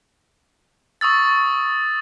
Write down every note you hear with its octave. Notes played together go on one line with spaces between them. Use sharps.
C#6 D#6 E6 A6